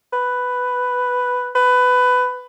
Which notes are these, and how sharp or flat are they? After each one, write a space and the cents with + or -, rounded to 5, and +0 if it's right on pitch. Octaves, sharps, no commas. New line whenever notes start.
B4 +5
B4 +15